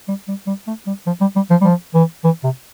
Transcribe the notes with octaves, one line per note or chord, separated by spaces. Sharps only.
G3
G3
G3
A3
G3
F3
G3
G3
F3
G3
F3
E3
E3
C3